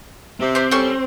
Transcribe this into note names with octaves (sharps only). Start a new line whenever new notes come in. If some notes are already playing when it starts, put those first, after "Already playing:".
C3 C4
G4 C5
G3 C#4 A4 C5 C6 C#6